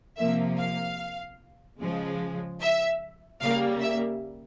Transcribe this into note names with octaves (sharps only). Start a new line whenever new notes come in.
C3 F3 A#3 E5
F5
C#3 F3 G#3
E5
C#3 G3 A#3 F5
E5